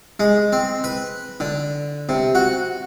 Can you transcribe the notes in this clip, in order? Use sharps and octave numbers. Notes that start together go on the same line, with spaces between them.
G#3
C4
B4
D3
C3
F#4